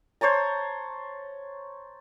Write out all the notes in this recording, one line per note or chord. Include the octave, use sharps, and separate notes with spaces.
C5 C#5 A5 A#5